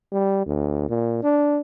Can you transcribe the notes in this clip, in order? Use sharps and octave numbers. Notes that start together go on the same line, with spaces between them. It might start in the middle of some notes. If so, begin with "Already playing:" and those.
G3
D2
A#2
D4